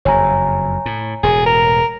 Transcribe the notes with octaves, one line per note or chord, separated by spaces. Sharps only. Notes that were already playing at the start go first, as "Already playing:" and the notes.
F#1 F2 C#5 G#5 A#5
A2
E1 A2 G#4
A#4